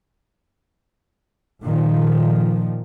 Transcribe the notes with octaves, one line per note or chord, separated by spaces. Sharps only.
A#2 D#3 F3